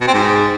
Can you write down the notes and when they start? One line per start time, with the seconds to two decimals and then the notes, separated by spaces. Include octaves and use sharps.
0.01 B2
0.07 C4
0.14 G#2